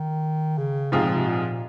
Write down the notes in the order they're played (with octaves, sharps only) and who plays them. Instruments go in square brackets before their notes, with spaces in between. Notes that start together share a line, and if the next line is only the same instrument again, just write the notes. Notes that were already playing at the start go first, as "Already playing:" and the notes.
Already playing: [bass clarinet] D#3
C#3
[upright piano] G#2 F3 C4 F4 G#4 [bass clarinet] C3
[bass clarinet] A#2
C3
A#2